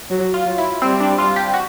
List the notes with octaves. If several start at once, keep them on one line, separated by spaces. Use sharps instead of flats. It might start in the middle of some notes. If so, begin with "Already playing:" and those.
F#3
F4
F#3
E4
G3 C4
D4
F4
G4
F#4